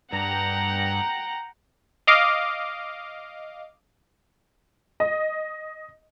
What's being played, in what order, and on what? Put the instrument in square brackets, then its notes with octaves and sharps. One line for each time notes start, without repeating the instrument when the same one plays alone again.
[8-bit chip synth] G2 [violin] F#5 [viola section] G5 A#5
[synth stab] D#5 F5 D6
[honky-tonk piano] D#5